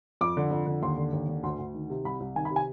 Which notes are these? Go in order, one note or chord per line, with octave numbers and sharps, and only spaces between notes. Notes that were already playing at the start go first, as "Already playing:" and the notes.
F2 D6
D3
F2
D3
D#2 C6
D3
D#2
D3
D2 C6
D2
D#3
C3
C2 B5
C2
D#3 G#5
B5
C3
G#5